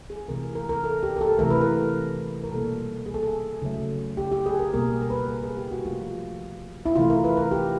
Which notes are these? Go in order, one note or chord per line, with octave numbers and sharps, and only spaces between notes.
G#4
C3 E3 A3 A#4
A#4
A#4
A4
G4
A#4
A4
C3 E3 A3 A#4
B4
A#4
A#4
B2 G3 A#3 A4
G#4
A4
G#4
C#3 F#3 A3
G4
G4
G#4
A#4
B2 G3 A#3 A#4
A#4
B4
A#4
G#4
G4
F#4
C3 F3 A3 F4
E4
C3 E3 A3 F4
A#4
B4
A#4
G4